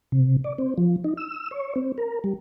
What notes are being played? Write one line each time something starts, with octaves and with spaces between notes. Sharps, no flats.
C3
D5
C4
F3
D#4
E6
C#5
C4
A#4
G3